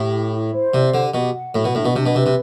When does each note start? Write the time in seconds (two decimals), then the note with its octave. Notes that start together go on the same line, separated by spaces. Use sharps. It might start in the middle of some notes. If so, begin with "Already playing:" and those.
Already playing: A2 G4
0.13 E4
0.32 E4
0.52 C5
0.74 C3 D5
0.93 D3 G4
1.13 B2 G4
1.34 F#5
1.54 A2 F#4
1.65 B2
1.74 A2 D4
1.85 B2
1.95 C3 D4
2.06 B2
2.15 C3 B4
2.26 C3